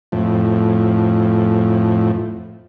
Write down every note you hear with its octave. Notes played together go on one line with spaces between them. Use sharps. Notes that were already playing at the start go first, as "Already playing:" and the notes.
F2 A2